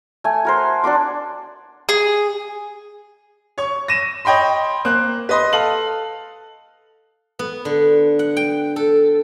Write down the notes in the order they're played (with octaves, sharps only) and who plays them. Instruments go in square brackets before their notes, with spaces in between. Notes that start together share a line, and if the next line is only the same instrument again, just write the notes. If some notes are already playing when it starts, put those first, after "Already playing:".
[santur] A3 G#5
F#4 A#4 C5
D4 F#4 C6 D6
[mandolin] G#4
[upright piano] C#5 C#6
A#6 D#7 E7
C#5 D#5 G5 B5 C6
A#3 C5 F#6
B4 D#5 C6
A4 F5 F#7
[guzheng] B3
D3
F#5
G5
A4